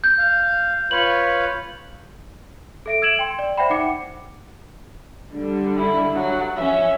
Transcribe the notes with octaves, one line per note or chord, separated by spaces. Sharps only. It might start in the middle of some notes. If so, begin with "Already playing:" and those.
G6
F5
F4 B4 C#5 F#7
A4 E5 D7
E6 G#6 D7 E7 F#7
G5 C6
D5
C5 D5 E5 F#5 G5 B5
D#4 F#5 D6 C#7
D3 G3
E4
F#3
F3 C#4 E5